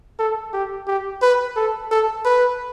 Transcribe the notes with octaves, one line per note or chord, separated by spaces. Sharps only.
A4
G4
G4
B4
A4
A4
B4